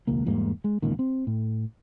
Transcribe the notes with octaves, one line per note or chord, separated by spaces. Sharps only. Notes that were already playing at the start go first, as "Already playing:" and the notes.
E1 C#2 A#3
E2 G#2 G3 A#3
G#3
E1 C#2 A#2 D#3
C4
A2